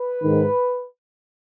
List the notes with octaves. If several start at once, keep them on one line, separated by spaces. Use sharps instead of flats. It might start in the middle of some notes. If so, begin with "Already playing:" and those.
Already playing: B4
G#2 D#3